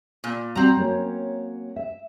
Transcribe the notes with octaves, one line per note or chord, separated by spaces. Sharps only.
A#2
G3 C4 F#4 A#5
F#3 A#3 C#4
E5